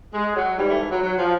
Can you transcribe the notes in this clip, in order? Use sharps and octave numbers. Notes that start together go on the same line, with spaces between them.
G#3
F#3
G#2 E3 G3
A3
F#3
F#3
F3